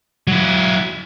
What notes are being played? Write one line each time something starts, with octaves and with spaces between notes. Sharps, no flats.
F#3 E4